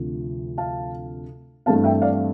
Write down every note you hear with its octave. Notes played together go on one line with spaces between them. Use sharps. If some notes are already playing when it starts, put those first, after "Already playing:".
Already playing: D2 C3 F3
F5 A5
G2 E3 A3 C4 F5 A5
E5 G5
D5 F5